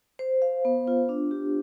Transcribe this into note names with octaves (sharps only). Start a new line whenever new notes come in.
C5
F5
B3
F4
D4
G4